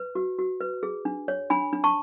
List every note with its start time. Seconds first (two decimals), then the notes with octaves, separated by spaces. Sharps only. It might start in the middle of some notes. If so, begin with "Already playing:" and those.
Already playing: B4
0.15 F#4
0.39 F#4
0.60 B4
0.83 G#4
1.05 D4
1.28 C#5
1.50 D4 G#5 B5
1.73 D4
1.84 A5 C#6